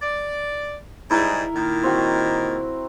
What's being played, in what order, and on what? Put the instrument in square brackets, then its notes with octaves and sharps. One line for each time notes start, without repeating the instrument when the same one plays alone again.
[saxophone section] D5
[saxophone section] G#2 G3 G#3 [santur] E4 A#4
[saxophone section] A#2 D#3
[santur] C4 F#4 C#6